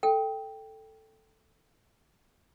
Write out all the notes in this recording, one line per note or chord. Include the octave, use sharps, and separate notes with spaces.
A4 G5